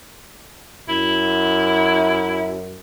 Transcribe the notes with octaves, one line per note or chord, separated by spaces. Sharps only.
F#2 E4